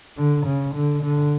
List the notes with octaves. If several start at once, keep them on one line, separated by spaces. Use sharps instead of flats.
D3
C#3
D3
D3